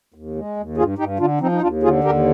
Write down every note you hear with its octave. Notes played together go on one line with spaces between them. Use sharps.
D#2
G#3
D#2
G2 F4 G#4
G2 D#4 G4
D3 D4 F4
F3 C4 D#4
D#4
D#2 D4 F4
D3 F4 G#4
D#2 G4 A#4